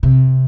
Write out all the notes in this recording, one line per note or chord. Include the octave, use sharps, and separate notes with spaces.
C3